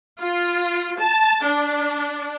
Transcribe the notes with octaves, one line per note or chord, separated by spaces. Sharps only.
F4
A5
D4